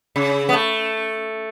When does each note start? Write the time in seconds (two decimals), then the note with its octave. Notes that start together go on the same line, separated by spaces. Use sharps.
0.16 C#3
0.49 B3
0.53 A3